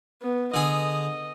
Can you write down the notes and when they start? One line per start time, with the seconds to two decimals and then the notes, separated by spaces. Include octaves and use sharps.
0.22 B3
0.54 D3 G#4 D#5